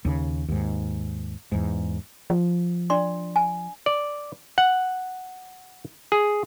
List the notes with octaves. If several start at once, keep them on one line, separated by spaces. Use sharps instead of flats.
D#2 C#3
D#2 G#2
E2 G#2
F3
D4 D5 C6
G#5
D5
F#5
G#4